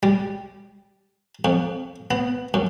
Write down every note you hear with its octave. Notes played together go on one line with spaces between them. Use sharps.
G3
F2
B3
F#2